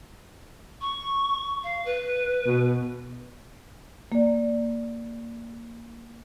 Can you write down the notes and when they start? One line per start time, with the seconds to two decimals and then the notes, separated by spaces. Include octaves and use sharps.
0.81 C#6
1.64 F5
1.85 B4
2.46 B2
4.12 A#3 D5